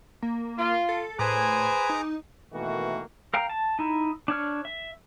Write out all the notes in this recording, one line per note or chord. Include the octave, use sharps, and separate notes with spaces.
A#3
F4
A4
A2 G#4 B4 C5 G#5 A#5 D6
D#4
B2 D#3 E3 A3 A#3 F#4
A#4 F5 G5 A#5
A5
D#4 E4
D4 C#5 F6
E5